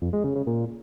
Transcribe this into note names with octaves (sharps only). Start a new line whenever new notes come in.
F2
G#3
C#3
C#3
A#2